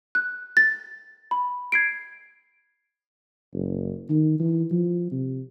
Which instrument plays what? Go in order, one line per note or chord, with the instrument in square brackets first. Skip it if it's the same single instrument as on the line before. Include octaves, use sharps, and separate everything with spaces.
[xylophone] F#6
A6
B5
G#6 C7 D7
[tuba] F#1
D#3
E3
F3
C3